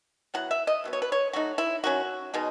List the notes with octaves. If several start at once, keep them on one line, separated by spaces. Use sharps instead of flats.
F#3 B3 E4 F#5
E5
D#5
B2 F#3 B3
C#5
B4
C#5
F#3 A3 D#4 F#4
E4
D#3 F#3 C#4 F#4
B2 G#3 D#4